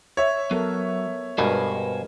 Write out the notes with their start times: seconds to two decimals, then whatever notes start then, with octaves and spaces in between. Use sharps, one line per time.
0.17 C#5 E5
0.51 F#3 B3 A4 A#4
1.38 G2 B2 G#3 A#4 C5 G#5